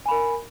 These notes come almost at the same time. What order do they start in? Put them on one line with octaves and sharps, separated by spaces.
G#5 B5 A#4